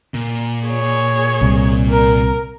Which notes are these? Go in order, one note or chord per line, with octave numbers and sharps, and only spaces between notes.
A#2
G#4 C#5
C2
A#4